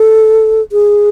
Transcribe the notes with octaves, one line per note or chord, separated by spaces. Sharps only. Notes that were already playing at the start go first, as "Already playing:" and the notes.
Already playing: A4
G#4